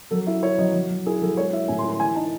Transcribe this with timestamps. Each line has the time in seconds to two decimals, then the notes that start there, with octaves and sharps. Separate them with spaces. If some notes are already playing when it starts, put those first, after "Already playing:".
0.11 F#3 A4
0.27 E4 E5
0.42 E4 C#5
0.58 F#3 D#5
0.74 F#3
0.90 F#3
1.06 E4 G#4
1.22 F#3 A4
1.37 G#3 C#5
1.53 E4 E5
1.68 A2 G#5
1.79 C6
1.84 E4
1.90 C6
2.00 E3 G#5
2.15 D#4 A5